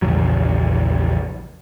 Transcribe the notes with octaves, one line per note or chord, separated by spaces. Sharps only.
A#1 E2 C#3 F#3